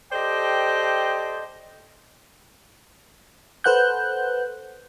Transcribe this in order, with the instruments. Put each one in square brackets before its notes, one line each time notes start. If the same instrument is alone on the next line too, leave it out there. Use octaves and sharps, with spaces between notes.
[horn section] G4 A4 C5 D5 D#5 G5
[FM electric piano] A4 B4 C5 F#5 F#6 G6